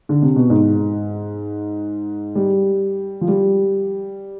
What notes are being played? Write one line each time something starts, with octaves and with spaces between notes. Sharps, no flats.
D3
C3
B2
G#2
G3
F3
G3